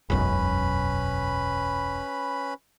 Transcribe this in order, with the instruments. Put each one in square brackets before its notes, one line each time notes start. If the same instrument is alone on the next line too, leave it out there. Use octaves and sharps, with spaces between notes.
[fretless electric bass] E1 B1 F#2 [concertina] C#4 B4 B5